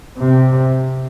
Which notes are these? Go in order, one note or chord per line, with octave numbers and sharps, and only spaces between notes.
C3